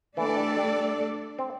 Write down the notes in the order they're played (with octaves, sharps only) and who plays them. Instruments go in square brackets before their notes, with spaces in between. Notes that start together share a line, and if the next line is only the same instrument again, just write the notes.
[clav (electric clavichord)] E3 [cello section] A3 D4 A4 D5
[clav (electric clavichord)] E3
G3
G3
C4